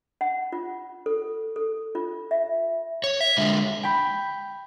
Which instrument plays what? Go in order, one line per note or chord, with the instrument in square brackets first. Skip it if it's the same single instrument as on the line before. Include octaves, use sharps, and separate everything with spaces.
[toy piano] F#5
F4
A4
A4
F4
E5
[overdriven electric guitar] C#5
E5
D3 G#3
[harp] G5 B5